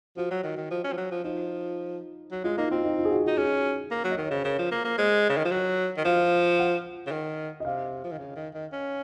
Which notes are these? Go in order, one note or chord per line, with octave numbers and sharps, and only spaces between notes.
F3 F#4
F#3
D#3
D#3
F3
C#4
F3
F#3
F3
F3 D#4
F#3
G#3 F4
A#3 D#4
C4 F4
D#4
F4
G#4
F#4
F#4
D#4
C#4 G#4
A#3
F#3
D#5
D#3
C#5
C#3 C5
C#3 A#4
F3
A#3 C5
A#3
G#3 C5
C#3
D#3
F3
F#3
D#3
F3 F5
F#5
C#3
D#3
D#5
C3 F5
F3
D#3
C#3
D#3
D#3
C#4